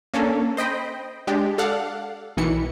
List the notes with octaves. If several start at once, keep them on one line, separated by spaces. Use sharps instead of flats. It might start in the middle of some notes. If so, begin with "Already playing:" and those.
A#3 C#4 D4 A4
C5 D#5 G5 B5
G#3 D4 G4
A4 D5 F5 F#5
B1 D#3 E3 C#7